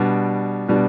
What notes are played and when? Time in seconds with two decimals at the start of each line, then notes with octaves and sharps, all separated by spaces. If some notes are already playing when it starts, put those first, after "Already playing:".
Already playing: B2 G3 B3 D4
0.68 B2 G3 B3 D4